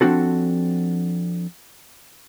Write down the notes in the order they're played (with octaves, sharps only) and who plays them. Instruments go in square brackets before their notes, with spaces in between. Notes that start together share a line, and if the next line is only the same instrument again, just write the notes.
[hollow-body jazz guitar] F3 C4 D4 F#4 A4